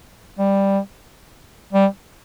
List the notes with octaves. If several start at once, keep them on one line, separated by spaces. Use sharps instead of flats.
G3
G3